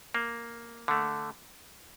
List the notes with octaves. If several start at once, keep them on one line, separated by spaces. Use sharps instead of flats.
A#3
D3 A3